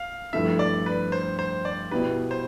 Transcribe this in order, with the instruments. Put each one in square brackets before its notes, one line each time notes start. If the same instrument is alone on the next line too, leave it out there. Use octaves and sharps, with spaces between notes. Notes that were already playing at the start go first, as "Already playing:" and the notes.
Already playing: [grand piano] F5
[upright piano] G2 F3 A3 E4 [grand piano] E5
[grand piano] D5
B4
C5
C5
D5
[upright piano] B2 B3 E4 G4 [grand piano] B4
[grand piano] C5